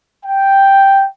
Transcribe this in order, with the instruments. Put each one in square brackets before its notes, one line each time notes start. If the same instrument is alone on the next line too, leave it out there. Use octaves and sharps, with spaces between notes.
[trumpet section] G5